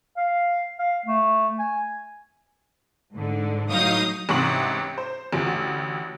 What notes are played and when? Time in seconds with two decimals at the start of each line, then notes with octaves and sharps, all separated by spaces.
0.17 F5
0.79 F5
1.06 A3
1.59 G#5
3.13 G#2 D3
3.70 A2 F#3 D#4 F5 D#6 G6
4.29 A1 G#2 C3 C#6 D#6 F#7
4.98 C5
5.33 A1 D2